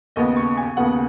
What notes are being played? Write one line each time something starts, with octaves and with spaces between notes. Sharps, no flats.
D#2 C#3 B3 D#5
C#6
G#5
D#2 C#3 B3 F#5